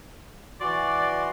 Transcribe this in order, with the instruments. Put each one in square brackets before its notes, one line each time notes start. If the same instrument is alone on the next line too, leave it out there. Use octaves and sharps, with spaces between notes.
[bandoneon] E3 F#4 C6 [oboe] D5